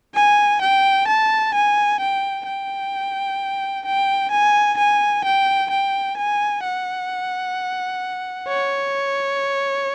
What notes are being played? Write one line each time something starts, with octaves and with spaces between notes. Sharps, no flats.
G#5
G5
A5
G#5
G5
G5
G5
G#5
G#5
G5
G5
G#5
F#5
C#5